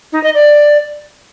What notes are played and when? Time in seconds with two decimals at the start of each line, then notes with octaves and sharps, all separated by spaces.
0.12 D#4
0.23 D#5
0.34 D5